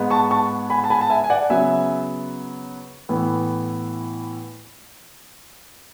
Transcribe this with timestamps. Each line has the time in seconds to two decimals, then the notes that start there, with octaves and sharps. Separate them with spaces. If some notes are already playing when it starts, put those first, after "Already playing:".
Already playing: G#2 G#3 B3
0.10 A5 C#6
0.31 A5 C#6
0.70 G#5 B5
0.84 A5
0.90 G#5 B5
1.01 A5
1.10 E5 G#5
1.24 G#5
1.30 D5 F#5
1.50 C#3 F#3 B3 E5 G#5
3.09 A2 E3 B3